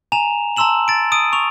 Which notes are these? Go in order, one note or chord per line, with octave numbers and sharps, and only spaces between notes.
G#5 A#5 E7 F7
A5 A#5 C6 E6 E7 F#7
A6 D7
D#6 D7 D#7
C#6 F7